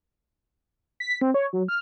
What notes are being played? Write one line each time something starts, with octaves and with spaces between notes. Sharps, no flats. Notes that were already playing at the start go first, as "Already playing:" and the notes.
B6
C4
C#5
F#3
F6